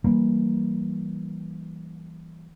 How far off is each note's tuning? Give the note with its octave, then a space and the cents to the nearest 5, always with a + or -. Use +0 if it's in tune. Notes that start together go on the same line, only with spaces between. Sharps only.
E3 +0 G3 -25 A#3 +0